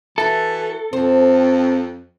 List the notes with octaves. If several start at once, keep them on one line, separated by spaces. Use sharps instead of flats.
E3 F#4 A4 E5
F2 C4 C5